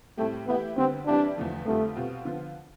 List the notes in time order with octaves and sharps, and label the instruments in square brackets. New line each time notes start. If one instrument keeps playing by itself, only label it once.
[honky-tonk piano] A2 G3 C4 G4 [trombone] A3
[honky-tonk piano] E3 A3 E4 G4 [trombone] B3
[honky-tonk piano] D3 G3 B3 [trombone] C4
[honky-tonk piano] E3 G3 C4 E4 G4 [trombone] D4
[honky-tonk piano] E2 D3 F3 A3
[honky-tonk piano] F2 D3 G3 C4 F4 [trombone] A3
[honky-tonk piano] B2 G3 C4 F4
D3 F3 B3 F4